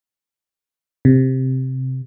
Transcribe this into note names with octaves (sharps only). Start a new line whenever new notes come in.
C3